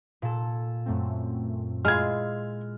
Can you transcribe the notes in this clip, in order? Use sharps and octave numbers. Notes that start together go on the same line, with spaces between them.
A#2 A4
F#2 A3 C4
G#3 E4 F4 F6 G#6